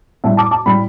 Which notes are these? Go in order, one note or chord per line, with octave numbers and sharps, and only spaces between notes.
A2 G3 E5 A5
A5 D6
A5 D6
A2 G3 G5 B5